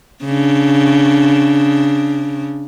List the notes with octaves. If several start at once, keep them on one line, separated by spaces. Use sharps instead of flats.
C#3 D4